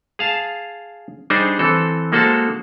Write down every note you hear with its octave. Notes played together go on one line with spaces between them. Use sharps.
G#4 F5 A5
G3 D4 D#4 G#4 C5
E3 C4 A4
G#3 A#3 F#4 A4 C5 A5